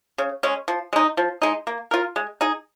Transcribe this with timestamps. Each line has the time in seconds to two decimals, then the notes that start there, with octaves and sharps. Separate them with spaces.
0.18 C#3
0.43 G#3 C#4
0.68 F3
0.93 G#3 D#4
1.17 F3
1.42 G#3 D#4
1.67 A#3
1.91 F4 A#4
2.16 G#3
2.41 D#4 G#4